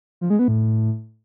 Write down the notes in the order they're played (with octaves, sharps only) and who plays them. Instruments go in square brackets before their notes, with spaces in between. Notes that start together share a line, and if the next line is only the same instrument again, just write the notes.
[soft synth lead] F3
G#3
B3
A2